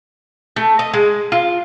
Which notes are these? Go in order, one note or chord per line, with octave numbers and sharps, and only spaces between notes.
A3
D#5
G#3
F4